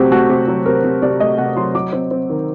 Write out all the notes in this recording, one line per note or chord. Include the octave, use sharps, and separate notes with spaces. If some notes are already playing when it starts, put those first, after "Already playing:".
Already playing: C3 F#3 A3 C4 F#4 G4
A3 F#4
C3 G4
F#3
C3 A#4
C3
C3 D5
A3 D#5
C3 F#5
F#3 C6
F#3 D6
C4
C4
D#3